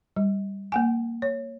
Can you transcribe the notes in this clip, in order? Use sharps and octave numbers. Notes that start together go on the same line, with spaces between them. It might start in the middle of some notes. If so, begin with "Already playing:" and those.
G3
A#3 F#5 G#5
C#5